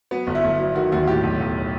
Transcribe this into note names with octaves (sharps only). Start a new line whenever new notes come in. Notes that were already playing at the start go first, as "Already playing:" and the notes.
F#3 B3
G1
E4
G1
F#3 E4
D#3 F#4
D#2 F#4
A2 G4
B1
B1